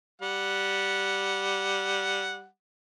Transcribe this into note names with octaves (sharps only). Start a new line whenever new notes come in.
G3 F#5